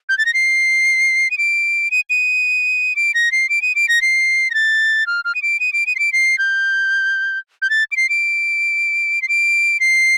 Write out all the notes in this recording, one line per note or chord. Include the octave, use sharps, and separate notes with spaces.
G6
A6
A#6
C7
D#7
D7
D#7
D#7
D7
A#6
C7
D7
D#7
D7
A#6
C7
A#6
A6
F6
F6
D#7
D7
D#7
D7
D#7
C7
D7
C7
G6
G6
A6
D7
C7
D7
C7
D7
C7